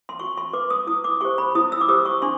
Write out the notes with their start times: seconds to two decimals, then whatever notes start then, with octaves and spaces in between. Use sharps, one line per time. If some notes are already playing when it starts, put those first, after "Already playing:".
0.09 C6
0.19 F#4 C#6
0.37 C6
0.53 B4 D6
0.70 D#6
0.87 E4 D#6
1.04 D6
1.21 G4 C5 C#6
1.38 B5
1.55 E4 D#6
1.72 E6
1.81 D6
1.88 G4 C5 D#6
2.05 C#6
2.22 D4 C6